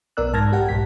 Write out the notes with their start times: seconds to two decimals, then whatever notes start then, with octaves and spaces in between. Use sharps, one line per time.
0.17 B1 B3 A#4 D5 E6 F#6
0.33 G#2 A5 F6 G#6 A#6
0.52 G4 A#4 F#5 G5
0.69 B1 G#2 B6